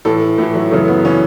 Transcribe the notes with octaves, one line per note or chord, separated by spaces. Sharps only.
A2 E3 A4
A2 E3 A3
F#3
F#2 C#3 E3 A3
B3
C#3 E3 C#4